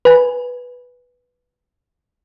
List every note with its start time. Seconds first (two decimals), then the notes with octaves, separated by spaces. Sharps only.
0.05 B4 G#5